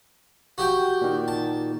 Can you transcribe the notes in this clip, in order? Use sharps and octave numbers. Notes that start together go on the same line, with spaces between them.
F#4 G4 G5
A#2 D#3
A5